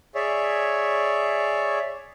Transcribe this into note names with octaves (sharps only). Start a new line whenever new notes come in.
G#4 C#5 D5 E5